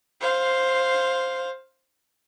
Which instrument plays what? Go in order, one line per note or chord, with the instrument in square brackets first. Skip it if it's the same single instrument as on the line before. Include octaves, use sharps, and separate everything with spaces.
[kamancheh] C5 F5